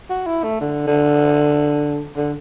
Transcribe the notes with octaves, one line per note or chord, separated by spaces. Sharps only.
F#4
E4
A3
D3
D3
D3